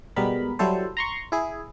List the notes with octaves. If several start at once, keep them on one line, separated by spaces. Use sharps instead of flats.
B2 G3 G#3 B3 A#4 B5
F#3 G3 E4 A4 C5
A#5 C6 C#6
E4 G#4